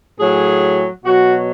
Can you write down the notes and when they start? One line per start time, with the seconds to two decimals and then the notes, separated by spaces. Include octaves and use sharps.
0.19 A2 F#3 G#4
1.05 B2 F#3 F#4